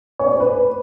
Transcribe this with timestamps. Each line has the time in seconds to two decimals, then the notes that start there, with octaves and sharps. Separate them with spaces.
0.19 C#5
0.26 D5
0.33 C5
0.40 B4